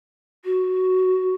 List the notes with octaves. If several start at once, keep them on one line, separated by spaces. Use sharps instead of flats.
F#4